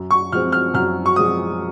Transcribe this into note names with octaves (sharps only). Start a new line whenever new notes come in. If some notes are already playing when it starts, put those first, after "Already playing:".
Already playing: F#2
C#6
F3 G#3 C4 F6
F6
F#2 F6
C#6
F3 G#3 C4 D#6